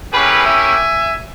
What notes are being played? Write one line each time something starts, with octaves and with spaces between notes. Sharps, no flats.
A#3 C#4 E4 G4 G#4 B4
E5 G#5